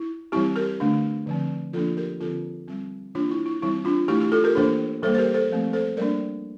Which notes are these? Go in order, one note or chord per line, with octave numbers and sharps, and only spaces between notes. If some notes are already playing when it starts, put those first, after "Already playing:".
Already playing: E4
E3 G3 C4 E4 G4
G4 A#4
D3 A3 D4
D3 F3 C4
F3 A#3 D4 F4 A4
G4 A#4
D3 F3 C4 F4 A4
G3 C4
E3 A#3 D4 F4
E4
E4
E3 G3 C4 E4
D4 F4
E3 A3 D4 E4 G4
E4 G4
F4 A4
G4 A#4
E3 A#3 D4 A4 C5
E3 G3 A#3 A4 C5
C5
G4 A#4
A4 C5
F3 A3 C4
A4 C5
G3 A#3 D4 A#4 D5